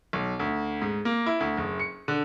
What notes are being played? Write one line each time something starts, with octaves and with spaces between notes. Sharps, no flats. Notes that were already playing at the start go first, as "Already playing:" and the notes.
B1
D2
G#2
A#3
E4
D2
F#1
C#7
D3